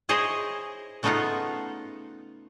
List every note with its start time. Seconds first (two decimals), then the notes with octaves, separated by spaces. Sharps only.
0.09 E4 G#4 C5 C#5 D#5
1.03 C#3 A3 B3 D#4 F4 F#5